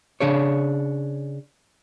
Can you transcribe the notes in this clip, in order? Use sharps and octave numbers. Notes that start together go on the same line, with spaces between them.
C#3 D4 G#4 C#5